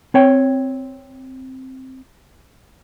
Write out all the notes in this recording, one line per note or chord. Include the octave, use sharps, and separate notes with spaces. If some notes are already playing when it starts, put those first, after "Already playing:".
C4 C#5 G5